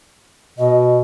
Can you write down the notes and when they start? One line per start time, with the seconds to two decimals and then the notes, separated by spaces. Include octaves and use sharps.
0.58 B2 D#5